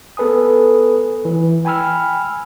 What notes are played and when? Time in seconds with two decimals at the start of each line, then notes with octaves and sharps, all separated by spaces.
0.17 B3 A4 B4 G#5 D#6
1.25 E3
1.65 G5 G#5 B5 E6 F6